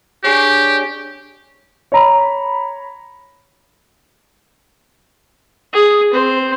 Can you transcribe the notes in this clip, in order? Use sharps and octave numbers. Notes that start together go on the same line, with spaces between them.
D4 G4 G#4 C#5
C#5 A#5 B5
G#4
C4 C5